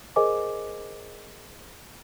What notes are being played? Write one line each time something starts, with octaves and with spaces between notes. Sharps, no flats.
G#4 A#4 C5 D#5 G#5 D6